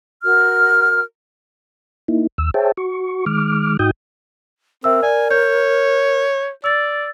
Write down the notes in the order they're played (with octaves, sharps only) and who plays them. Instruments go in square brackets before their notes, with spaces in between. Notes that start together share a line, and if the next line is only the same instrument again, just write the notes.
[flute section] F#4 A#4 F6
[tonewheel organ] A#3 D#4 E4
D#2 E6
G#4 C5 C#5 E5 G5 A5
F#4 C#6
D#3 G#3 D6 F6
G#2 D#4 F#4 G5 D#6 G6
[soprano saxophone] C4 [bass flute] A#4 [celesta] E5 E6
[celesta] D5 [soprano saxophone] G#5
[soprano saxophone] C#5 [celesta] G6
[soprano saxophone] D5 [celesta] E6 A6